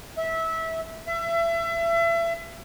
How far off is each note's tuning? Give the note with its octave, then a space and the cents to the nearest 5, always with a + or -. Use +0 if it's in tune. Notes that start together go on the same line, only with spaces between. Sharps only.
E5 -20
E5 +30